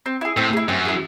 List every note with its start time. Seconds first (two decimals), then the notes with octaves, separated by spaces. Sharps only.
0.06 C4
0.21 E4 G#4
0.37 A2 C4
0.53 E4 G#4
0.69 F#2 C4
0.85 E4 G#4